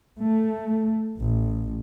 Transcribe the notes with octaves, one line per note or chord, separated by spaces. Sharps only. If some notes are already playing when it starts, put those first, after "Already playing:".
A3
A1